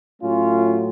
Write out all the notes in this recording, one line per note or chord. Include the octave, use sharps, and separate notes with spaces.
A2 F#3 A3 C#4 F4